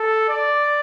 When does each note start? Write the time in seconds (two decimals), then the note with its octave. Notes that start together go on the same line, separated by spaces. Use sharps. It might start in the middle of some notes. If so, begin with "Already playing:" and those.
Already playing: A4
0.29 D5